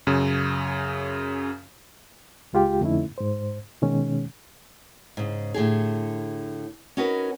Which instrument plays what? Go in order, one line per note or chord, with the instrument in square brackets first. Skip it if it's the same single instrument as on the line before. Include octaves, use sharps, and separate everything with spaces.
[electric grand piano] F#2 C#3
[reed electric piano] C#2 G#3 F4 G4 G5
F2 D3 A3 C#4 D#4 E4
G#2 C5
B2 D#3 G#3 C#4
[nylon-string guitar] G#2 C#3
A2 D3 G4 G#4
C#4 D#4 F#4 A#4 B4